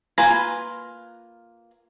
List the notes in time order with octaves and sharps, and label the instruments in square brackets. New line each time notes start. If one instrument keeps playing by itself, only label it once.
[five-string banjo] A#3 F4 B4 G#5 A#5